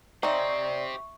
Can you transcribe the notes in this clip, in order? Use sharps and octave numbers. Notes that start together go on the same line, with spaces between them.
C4 D#4 G4 C5 D5 E5 C#6